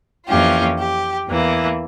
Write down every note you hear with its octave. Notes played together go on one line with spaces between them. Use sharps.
F2 E3 A#3 C#4 F4 G4
G4
E2 E3 A#3 E4